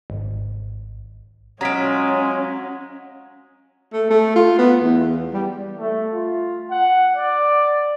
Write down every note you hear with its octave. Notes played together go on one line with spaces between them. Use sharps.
G#1
F#3 G#3 C#4 F4 A#5 B6 D7
A3
A3
F4
B3
E2
G3
A3
F4
F#5
D5